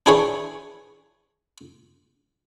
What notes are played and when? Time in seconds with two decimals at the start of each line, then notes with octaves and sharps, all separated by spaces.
0.06 D4 E4 G#4 B4 C#5